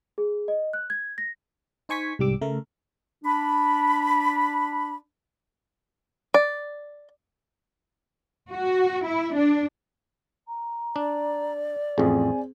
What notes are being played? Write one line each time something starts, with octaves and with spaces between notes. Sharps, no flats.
G#4
D#5
F#6
G#6
A#6
D#4 C5 G#5 C#6 G#6 B6
C2 G#2 G3 G4 D6 E6
C#3 A3 A4 A#4
D4 B5
D5
F#4
E4
D4
A#5
D4 D5
A1 F2 C4 G#4 G#5